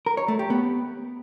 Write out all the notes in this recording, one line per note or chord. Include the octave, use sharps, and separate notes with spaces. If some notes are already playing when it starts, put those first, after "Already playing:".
A#4
C#5
A3
G4
B3